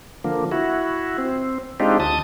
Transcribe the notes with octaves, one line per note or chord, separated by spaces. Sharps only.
D3 F3 A#3
E4 F#4
C4
G#3 C4 D4 D#4 F4 G4
D2 A5 D#6